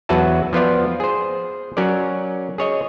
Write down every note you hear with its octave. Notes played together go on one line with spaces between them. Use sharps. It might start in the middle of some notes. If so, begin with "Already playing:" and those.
E2 F#3 F#4 B4 E5 A5
F3 B3 F4 D5
G#4 C5
F#3 C#4 A#4 D5
G#4 C#5 D#5